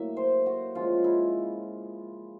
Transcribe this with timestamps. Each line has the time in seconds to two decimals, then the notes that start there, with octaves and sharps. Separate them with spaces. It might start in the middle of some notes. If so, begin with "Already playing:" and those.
Already playing: A2 F#3 A#3 E5
0.17 C5
0.46 F#4
0.75 C#3 F3 G#3 F4
1.04 E4